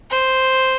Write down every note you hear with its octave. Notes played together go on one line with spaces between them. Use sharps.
C5